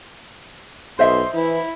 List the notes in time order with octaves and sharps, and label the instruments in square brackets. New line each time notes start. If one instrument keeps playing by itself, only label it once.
[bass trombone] B1 [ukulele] C5 D#5 E5 [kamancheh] C6
[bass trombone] E3 [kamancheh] E4